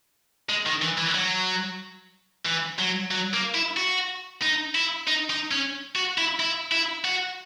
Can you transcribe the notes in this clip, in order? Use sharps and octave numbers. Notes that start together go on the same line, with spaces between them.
G#3
D#3
E3
E3
F#3
E3
F#3
F#3
A#3
E4
F#4
D#4
E4
D#4
D#4
C#4
F#4
E4
E4
E4
F#4